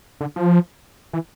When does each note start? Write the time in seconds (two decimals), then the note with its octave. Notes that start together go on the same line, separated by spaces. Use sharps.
0.21 D3
0.36 F3
1.13 E3